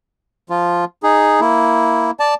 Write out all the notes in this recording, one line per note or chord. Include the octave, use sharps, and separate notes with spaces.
F3 F4
D#4 G#4
A#3 E4
D5 A5